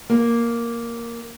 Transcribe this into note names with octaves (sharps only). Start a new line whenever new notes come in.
A#3